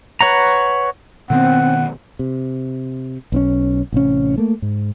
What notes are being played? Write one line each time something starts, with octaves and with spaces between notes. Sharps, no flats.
B4 C#5 F#5 A#5
B2 D#3 B3 C4 F#5
C3
B1 C4 C#4
A1 C3 C#4
A3 A#3
G#2